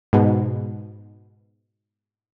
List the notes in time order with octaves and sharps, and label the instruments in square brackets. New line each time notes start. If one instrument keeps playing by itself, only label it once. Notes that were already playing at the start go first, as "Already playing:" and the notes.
[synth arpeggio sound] G#2 B2